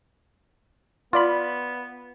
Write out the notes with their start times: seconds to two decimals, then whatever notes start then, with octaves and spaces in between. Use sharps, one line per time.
1.13 B3 F4 D5 B5